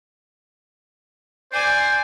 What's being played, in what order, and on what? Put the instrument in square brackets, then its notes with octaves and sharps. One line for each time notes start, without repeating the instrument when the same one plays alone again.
[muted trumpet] C5 [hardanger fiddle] D5 G#5